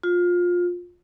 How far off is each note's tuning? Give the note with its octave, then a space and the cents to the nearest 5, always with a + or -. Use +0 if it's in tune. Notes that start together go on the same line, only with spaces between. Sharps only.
F4 +20